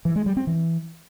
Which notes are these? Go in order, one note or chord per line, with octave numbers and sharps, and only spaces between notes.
E3
G#3
G3
C4
E3